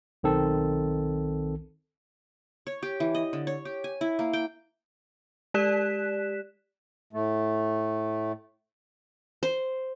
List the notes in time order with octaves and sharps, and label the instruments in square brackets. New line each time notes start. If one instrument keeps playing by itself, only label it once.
[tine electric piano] B1 D#3 C4 A4
[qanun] C#5
G4
E3
D#5
D3
C#5
G4
G#5
E4
A#3
G5
[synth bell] G#3 G4 D5 F#6 B6 E7
[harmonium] A2 A3
[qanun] C5